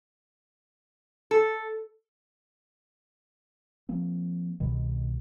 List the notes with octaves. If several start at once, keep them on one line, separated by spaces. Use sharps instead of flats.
A4
F3 A#3 C4
C2 B2 D#3